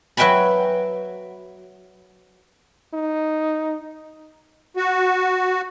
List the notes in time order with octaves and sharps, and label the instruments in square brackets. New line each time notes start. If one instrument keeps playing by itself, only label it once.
[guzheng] F#3 B4 E5 G5 G#5 B5
[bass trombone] D#4
[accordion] F#4